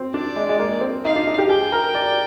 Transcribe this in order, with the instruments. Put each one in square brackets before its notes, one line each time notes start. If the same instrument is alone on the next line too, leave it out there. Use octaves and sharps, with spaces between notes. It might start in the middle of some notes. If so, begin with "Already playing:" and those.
Already playing: [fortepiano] C4
[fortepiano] D4 [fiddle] D5
[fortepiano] G#3
G#3
A#3
C4
[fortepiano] D#4 [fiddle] F5
[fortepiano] D4
D#4
G4
[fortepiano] G#4 [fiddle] G5
[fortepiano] A#4
D5